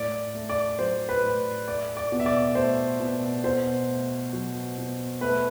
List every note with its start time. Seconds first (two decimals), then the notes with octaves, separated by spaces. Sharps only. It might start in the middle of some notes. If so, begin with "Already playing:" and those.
Already playing: A2 D5
0.35 A3
0.49 D5
0.78 F#3 C5
1.09 B4
1.24 A2
1.68 A3 D5
1.97 D5
2.12 B2
2.20 E5
2.26 D5
2.55 A3 C5
3.00 B2
3.44 B2 C5
3.89 A3
4.33 F#3
4.78 B2
5.21 A3 B4